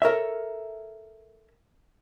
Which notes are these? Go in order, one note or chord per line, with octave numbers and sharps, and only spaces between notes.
A4 A#4 C#5 E5